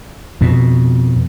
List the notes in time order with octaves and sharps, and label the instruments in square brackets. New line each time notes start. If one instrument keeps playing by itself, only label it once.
[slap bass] F2 B2